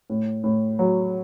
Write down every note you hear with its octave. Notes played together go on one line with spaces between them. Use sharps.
A2
A2
F#3